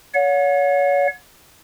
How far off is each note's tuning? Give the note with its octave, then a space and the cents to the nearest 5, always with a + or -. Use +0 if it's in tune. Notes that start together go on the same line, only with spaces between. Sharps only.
C#5 +30 F#5 -40